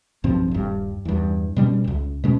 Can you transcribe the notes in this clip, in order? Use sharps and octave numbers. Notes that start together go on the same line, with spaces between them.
B1 G2 F3 C4
D#1 G2
E2 G2
B2 G3 C4 C#4
D1 C#2
B2 G#3 C#4